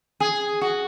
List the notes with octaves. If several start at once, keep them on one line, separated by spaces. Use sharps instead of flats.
G#4
F#4